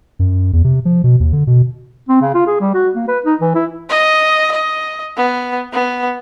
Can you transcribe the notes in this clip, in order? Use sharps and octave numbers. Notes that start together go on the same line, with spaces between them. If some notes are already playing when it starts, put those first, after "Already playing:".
F#2
E2
C3
F3
B2
D#2
D3
B2
C4
C#3
F4
G#4
G3
F#4
A#3
B4
D#4
E3
E4
D#5
D#5
B3
B3